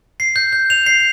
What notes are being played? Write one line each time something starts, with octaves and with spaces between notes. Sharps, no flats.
C7
G6
G6
F7
C7